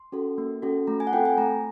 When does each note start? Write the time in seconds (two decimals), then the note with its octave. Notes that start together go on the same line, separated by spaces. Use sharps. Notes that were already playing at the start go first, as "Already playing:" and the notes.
Already playing: C6
0.12 C#4 F#4 A4
0.38 A#3
0.62 C#4 F#4 A4
0.87 A3 A#5
1.00 G#5
1.07 F#5
1.13 C4 F4 A4 G5
1.25 G#5
1.37 A3 A#5